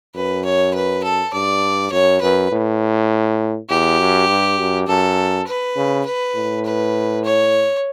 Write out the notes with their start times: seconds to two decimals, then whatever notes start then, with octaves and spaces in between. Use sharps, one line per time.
0.15 F#2 B4
0.45 C#5
0.74 B4
1.04 A4
1.33 G2 D5
1.92 F#2 C#5
2.22 F#2 B4
2.52 A2
3.69 E2 G4
3.99 F#2
4.29 G2
4.59 F#2
4.88 F#2 A4
5.47 B4
5.76 C#3
6.06 B4
6.35 A2
6.65 B4
7.24 C#5